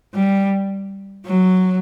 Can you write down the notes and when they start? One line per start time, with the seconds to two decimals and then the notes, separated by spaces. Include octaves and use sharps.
0.14 G3
1.26 F#3